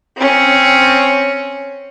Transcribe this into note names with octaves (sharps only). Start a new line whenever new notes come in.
C4 C#4